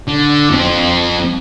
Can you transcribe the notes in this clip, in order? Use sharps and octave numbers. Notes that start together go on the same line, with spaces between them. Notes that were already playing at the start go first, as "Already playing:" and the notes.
D3
F2 C4